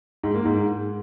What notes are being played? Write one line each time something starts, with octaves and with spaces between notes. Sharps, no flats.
G#2
A#3
G#2